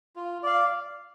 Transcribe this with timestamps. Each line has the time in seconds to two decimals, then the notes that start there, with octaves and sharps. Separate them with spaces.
0.16 F4
0.43 D5 F5